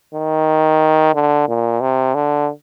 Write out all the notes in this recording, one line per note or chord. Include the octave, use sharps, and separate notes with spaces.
D#3
D3
A#2
C3
D3